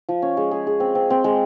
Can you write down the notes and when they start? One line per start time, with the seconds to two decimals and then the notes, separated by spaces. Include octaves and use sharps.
0.09 F3
0.22 C#4
0.37 G#3
0.51 G#4
0.67 G#4
0.80 C4
0.95 C4
1.10 C4
1.24 G#3